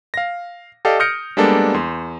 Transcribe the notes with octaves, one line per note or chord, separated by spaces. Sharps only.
F5 A#6
G4 A4 D5 D#5 F5
D#6 F6 G6 A#6 C#7 D7
G3 G#3 A#3 B3 D4 A4
E2 C6